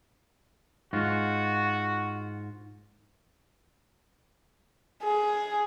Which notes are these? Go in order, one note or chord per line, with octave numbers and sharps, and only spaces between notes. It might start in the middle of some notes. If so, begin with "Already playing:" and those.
G#2 F4 F#4
G#4